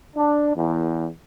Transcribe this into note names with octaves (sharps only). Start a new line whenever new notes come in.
D4
E2